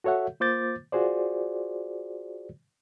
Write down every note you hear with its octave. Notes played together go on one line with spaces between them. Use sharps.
F#4 A4 C#5 E5 F#5
A#3 F4 C5 D6 G6 A6
F4 F#4 G#4 C5 D5